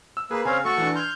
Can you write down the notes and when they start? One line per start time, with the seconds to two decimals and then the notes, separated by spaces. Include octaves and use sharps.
0.17 E6
0.31 A#3 G#4 B4
0.45 C#3 C4 C#4 F5 G#5
0.65 A3 F#4 A4 C#6
0.78 E3 D4
0.95 C6 F6 G6 G#6